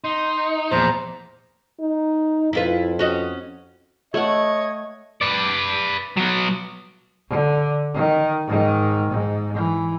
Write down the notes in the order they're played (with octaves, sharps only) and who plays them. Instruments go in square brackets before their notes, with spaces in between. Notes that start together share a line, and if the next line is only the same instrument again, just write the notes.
[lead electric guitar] D#4 [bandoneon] C6
[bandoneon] E2 C5 A#5 [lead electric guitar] A#2 [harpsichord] F3
[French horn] D#4
[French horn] F2 [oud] E4 F4 B4
[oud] C#4 F#4 D#5
[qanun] A3 F#5 [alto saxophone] C#5 [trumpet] D#5
[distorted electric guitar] B4 D5
F#3 B3
[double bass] D3
D#3
G#2 D#3
G#2
E3